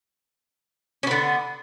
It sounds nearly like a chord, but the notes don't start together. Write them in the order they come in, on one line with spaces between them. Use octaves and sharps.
C#4 B3 D3